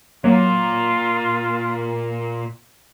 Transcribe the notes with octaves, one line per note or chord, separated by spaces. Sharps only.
A#2 F#3 A#3 F4